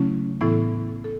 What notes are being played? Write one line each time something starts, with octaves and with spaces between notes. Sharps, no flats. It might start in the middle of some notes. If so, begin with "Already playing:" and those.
Already playing: C#3 F#3 A3 C#4 E4
A2 E3 B3 E4 A4
A4